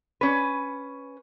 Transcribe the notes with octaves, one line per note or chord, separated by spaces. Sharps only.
C#4 B4